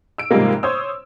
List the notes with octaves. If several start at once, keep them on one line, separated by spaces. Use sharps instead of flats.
E6 D7
G#2 C3 F3 G3 G#3 A#3
C5 C#5 D#6 E6